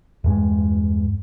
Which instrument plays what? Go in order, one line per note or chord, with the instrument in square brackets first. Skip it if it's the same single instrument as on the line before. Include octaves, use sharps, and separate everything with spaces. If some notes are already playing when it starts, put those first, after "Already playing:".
[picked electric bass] E2 G2 G#3